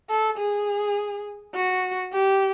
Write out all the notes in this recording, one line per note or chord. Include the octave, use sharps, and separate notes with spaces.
A4
G#4
F#4
G4